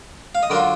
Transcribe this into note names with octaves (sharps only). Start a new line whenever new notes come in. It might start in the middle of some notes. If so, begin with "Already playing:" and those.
F5
D#5
D3 F#3 D4 F4 A#4 D5